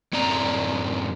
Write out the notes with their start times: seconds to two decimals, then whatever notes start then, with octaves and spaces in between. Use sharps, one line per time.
0.13 F#2 A2 C4 D5 A#5